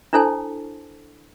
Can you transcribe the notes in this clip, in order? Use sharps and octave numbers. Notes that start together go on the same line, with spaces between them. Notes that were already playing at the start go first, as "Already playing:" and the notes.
D4 E4 A4 C5 G#5 A5